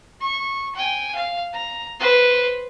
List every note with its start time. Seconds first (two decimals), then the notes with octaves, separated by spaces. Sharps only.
0.21 C#6
0.75 G5 G#5
1.15 F5
1.53 A#5
2.00 B4 C5